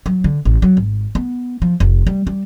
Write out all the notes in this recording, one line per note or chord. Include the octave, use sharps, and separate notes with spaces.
F#3
D3
A1
F#3
G#1
B3
F3
F1
G3
G3